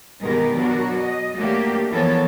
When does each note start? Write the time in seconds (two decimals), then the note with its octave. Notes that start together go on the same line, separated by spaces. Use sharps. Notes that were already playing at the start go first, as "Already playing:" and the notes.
0.22 B2 D#3 G#3 G4 A#4 B4
0.53 B2 F#3 D4 F#4 A#4
1.00 D#5
1.35 F#3 A3 A#3 D4 F#4 G4
1.90 E3 F3 B3 A4 A#4 C#5